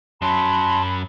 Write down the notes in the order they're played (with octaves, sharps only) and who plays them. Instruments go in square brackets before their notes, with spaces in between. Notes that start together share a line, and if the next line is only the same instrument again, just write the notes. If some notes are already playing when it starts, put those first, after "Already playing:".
[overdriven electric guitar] F#2 F#3 [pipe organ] A5 C6 [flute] B5